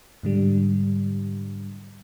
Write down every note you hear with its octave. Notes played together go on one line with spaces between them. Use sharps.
G#2 D3 G3